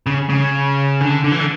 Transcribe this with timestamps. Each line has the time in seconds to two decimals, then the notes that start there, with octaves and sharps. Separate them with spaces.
0.06 C#3
0.29 C#3
1.01 D3
1.24 D3
1.32 E3
1.40 D3